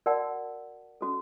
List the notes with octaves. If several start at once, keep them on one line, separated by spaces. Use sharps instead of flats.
F#4 A#4 D5 F#5 A5
C#4 F#4 A4